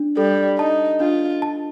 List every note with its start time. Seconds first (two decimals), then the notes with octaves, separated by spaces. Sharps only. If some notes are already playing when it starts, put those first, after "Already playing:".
Already playing: D4
0.17 G3 A4
0.59 D#4 A5
1.00 D4 F4
1.42 A5